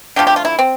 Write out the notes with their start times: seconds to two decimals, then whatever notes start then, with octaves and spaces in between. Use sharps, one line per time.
0.16 D3 F3 A3 G4
0.27 G4
0.36 F4
0.45 E4
0.59 C4